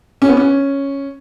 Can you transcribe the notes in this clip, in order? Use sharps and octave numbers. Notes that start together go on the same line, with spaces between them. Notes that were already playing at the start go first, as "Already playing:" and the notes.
C#4
B3
C#4